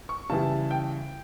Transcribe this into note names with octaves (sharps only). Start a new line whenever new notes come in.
C#6
C#3 E3 G3 A5
G5